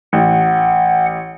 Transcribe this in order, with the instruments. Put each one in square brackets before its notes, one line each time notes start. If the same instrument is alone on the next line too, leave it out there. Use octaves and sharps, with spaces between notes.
[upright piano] A1 [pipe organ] F#5